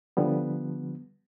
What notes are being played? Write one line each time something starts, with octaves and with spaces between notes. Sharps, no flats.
D3 F3 G3 B3